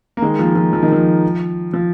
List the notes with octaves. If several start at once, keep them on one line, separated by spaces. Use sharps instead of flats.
A#3
D#3 G#3
F3 A#3
F3
F3
D#3
F3
F3